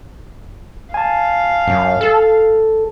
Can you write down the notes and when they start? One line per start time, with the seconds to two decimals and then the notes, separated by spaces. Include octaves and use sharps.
0.94 F5 G#5 A5
1.67 F#2
2.01 A4